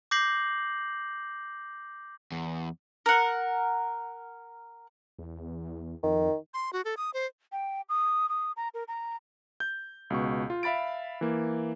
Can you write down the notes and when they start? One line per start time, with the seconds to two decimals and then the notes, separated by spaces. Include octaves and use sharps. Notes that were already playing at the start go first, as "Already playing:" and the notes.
0.11 D6 G6 A#6 C7 F#7
2.32 E2
3.06 A#4 F#5
5.19 E2
6.03 F2 D#3
6.54 C6
6.73 F#4
6.85 A4
6.97 D#6
7.14 C5
7.52 G5
7.89 D#6
8.29 D#6
8.57 A#5
8.74 A#4
8.88 A#5
9.60 G6
10.10 C#2 B2 C#6
10.50 F4
10.63 E5 F5 B5 A6 D7
11.21 E3 A#3